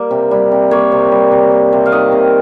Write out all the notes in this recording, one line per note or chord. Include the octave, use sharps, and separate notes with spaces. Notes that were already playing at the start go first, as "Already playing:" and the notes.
Already playing: G3 A#3
C3
G3
C3
A#3 C#5
C3
G3
C3
A#3
C3
F5
D#3 D#5
C3